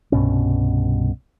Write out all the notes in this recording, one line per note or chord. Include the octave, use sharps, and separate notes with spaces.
C2 G2 B2 C#4